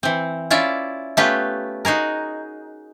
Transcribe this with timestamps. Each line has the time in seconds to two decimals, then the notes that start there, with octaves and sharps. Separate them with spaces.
0.03 E3 C4
0.51 C#4 E4 F4 D5 E5
1.17 A3 B3 C#4 F4 G4 B4
1.85 D#4 F#4 G#4 A#4